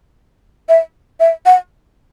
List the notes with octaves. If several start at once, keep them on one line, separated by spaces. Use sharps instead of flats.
E5
E5
F#5